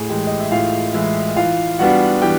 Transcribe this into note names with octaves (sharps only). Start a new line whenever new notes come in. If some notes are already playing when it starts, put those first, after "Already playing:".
Already playing: A2 G#4 G#5
E3 G#3 G4 G5
D#5
E5
A2 F4 F5
E3 G#3 E4 E5
E3 F4 F5
G3 B3 D4 F#4 F#5
E3 G4 G5